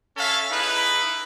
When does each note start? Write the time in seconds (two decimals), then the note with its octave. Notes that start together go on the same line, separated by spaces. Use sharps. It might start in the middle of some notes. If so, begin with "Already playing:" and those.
0.17 C#4 A4 E5 F5
0.51 D#4 E4 G#4 B4